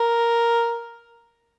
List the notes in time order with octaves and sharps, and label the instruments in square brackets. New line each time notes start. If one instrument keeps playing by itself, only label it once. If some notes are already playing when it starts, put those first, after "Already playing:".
Already playing: [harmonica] A#4